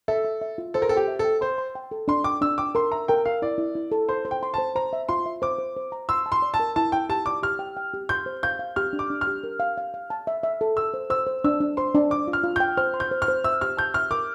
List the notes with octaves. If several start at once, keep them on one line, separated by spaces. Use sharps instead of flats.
A4 E5
E5
E5
F4
A4 C5
A#4
A4 G5
G4
E5
A4
G5
C5 C6
C6
G5
A4
D4 C6
G5 D6
D4 E6
G5 D6
A#4 C6
E5 A#5
A#4 G5
A#4 F5
E4 D5
E4
E4
A4
C5 C6
C5
G5
C6
C5 A5
C5 A#5
E5
F4 C6
E5
C5 D6
C5
C5
A#5
C6 E6
A5
C6
D5
A5
A#4
E4 A5
E4 G5
G4 A5
D5 D6
G4 F6
G5
G5
G4
C6 G6
C5
F5 G6
F5
G4 F6
D4
D6
D4
F6
G4
A#4
F5
F5
F5
A5
E5
E5
A4
A4 E6
C5
C5 E6
C5
D4 E6
D4
C5 C6
D4
D5 D6
F4
F6
F4
G5 G6
C5 F6
C6
G6
C5
F6
C5
E5 E6
G4 F6
A5 G6
E5 F6
A#4 D6